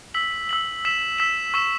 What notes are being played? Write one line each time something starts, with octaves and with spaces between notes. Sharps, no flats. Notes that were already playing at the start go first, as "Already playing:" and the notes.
E6 B6 F#7
E6 B6 F#7
E6 B6 E7
E6 B6 E7
C#6 E6 B6 E7